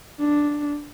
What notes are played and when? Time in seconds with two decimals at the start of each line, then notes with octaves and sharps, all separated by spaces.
0.20 D4